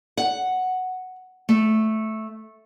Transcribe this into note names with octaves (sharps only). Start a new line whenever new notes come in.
F#5
A3